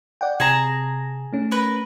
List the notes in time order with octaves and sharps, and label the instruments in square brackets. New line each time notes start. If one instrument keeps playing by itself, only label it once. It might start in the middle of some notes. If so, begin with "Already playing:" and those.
[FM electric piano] D5 F#5 G5
[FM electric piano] C3 [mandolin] G#4 A5 A#5
[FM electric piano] A3 C#4
[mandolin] A#4 B4